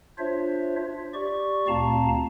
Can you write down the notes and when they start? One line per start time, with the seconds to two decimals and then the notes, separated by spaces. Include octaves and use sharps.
0.18 D4 F4 C5 C#5 E5
1.14 G4 D5 C#6
1.68 D2 A#2 C4 F5 A5 A#5